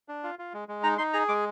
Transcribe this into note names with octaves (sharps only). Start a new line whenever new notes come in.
D4
F4
F4
G#3
G#3
D#4 A#5
D#4 C6
G#4 A#5
G#3 D6